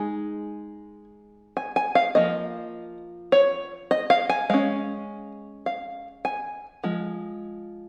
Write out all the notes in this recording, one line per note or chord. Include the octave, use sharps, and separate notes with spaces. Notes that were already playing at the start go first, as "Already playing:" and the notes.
Already playing: G#3 D#4 G#5
G#5
G#5
F5
F3 A#3 D#5
C#5
D#5
F5
G#5
G#3 C#4 F5
F5
G#5
F3 G#3